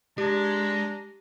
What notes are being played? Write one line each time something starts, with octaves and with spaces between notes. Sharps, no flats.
G#3 D4 G4 A#5